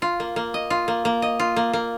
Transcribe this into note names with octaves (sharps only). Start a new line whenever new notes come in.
F4
A#3
A#3
D#5
F4
A#3
A#3
D#5
F4
A#3
A#3